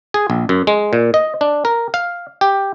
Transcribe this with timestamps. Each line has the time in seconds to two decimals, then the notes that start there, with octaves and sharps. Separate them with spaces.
0.14 G#4
0.30 A#1
0.49 F#2
0.67 G#3
0.93 A#2
1.14 D#5
1.41 D4
1.65 A#4
1.94 F5
2.41 G4